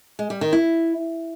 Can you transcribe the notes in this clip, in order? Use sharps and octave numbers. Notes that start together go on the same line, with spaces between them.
G#3
G3
D#3
E4